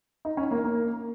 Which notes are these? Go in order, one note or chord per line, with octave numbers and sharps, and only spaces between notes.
D#4
C#4
A#3
A#3